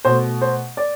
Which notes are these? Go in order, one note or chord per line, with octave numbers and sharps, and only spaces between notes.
B2 A3 C5
C5
D5